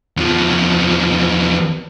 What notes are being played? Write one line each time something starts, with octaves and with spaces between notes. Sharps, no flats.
E2 F3